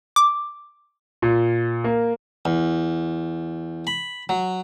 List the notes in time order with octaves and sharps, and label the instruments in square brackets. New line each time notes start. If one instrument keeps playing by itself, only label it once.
[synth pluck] D6
[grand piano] A#2
A#3
[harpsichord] E2
B5
F#3